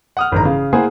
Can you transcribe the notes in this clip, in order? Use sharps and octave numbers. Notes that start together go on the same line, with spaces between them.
F#5 D#6 F6
A1 G2 D#3 A#5
C#3 F5
A#3 E4 G#4 C5 F#5 G#5